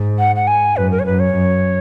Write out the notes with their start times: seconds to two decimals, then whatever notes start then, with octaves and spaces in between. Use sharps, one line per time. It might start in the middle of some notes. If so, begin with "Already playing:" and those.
Already playing: G#2
0.19 F#5
0.36 F#5
0.47 G#5
0.76 F#2 B4
0.91 A#4
0.99 C#5
1.05 F#2 B4
1.19 C#5
1.35 F#2